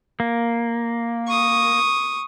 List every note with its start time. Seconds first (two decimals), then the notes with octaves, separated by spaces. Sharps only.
0.20 A#3
1.27 C#6 D#6